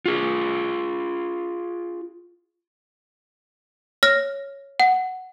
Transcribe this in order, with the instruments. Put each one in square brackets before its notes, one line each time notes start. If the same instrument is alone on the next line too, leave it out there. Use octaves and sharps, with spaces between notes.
[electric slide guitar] F4 G#4
[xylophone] C#5 F6 A#6
F#5